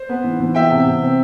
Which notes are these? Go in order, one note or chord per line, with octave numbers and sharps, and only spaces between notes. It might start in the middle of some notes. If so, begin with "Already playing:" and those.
Already playing: C5
B3
E3
E3
B3 E5 G5
C3
C3
C4